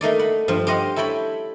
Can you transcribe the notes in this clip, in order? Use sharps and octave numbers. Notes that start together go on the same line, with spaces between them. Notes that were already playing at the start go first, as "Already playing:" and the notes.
A3 A#3 D#4 D5
F#5 B5
G2 F3
G4 C5 D#5 F5 F#5
E4 A4 C#5 G5 B5